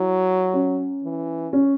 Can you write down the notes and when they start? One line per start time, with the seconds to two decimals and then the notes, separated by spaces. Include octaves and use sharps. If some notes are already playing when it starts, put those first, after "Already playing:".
Already playing: F#3 E4
0.54 C#4
1.04 E3
1.53 C#4